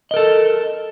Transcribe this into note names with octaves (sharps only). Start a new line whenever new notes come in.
A4 A#4 D#5